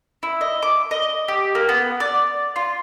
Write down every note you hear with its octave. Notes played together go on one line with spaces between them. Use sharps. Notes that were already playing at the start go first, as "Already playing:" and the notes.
E4
D#5
D6
D#5
G4
A#3
B3
D5
F4